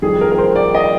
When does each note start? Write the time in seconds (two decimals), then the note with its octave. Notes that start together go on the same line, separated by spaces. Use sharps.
0.02 F2 D#3 G3 G#4
0.21 A#4
0.31 A#4
0.38 C5
0.56 D5
0.75 D#5